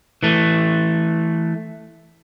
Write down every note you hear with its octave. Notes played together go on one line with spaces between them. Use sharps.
E3 A3